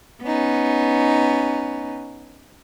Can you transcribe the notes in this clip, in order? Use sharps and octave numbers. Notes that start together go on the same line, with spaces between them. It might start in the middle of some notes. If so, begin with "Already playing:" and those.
B3 C#4 D#4